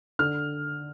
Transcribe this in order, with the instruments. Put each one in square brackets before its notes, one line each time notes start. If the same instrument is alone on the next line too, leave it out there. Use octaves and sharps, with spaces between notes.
[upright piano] D3 F6